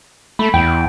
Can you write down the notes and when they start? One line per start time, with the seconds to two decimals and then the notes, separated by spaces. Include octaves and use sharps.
0.39 A3 B5
0.54 E2 G5